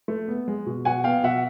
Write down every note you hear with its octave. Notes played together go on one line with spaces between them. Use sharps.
A3
B3
G#3
B2
B2 F#5 G#5
B3 F5 G5
B2 E5 F#5